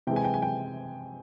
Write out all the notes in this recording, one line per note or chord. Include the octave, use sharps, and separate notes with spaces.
C3 E3 G#3 G5
G#5
G5
G#5
G5